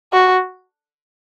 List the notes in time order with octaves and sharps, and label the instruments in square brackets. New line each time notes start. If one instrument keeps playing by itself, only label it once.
[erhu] F#4